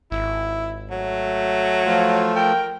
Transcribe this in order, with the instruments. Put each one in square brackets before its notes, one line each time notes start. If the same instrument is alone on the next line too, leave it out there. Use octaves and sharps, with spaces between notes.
[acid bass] G#1 [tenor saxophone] E4
[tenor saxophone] F#3 [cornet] A3
[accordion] F3 A3 [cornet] F4
[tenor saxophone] A#4 [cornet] G5